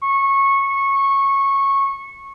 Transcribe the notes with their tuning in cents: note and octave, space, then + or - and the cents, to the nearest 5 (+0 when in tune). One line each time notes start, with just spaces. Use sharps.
C#6 -15